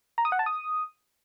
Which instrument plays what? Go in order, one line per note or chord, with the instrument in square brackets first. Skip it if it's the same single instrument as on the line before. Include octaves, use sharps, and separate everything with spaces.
[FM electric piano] A#5
D#6
F#5
A5
D#6